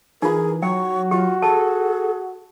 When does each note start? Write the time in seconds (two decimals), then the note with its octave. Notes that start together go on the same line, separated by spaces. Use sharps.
0.22 E3 D#4 F4 G#4 A#4
0.63 F#3 F#4 G5 C#6
1.11 F4 G4
1.42 G#4 A4 A5